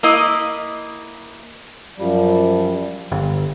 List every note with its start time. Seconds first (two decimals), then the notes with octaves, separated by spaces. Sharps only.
0.03 A#3 E4 D#5
1.98 F#2 F3 G3
3.12 G1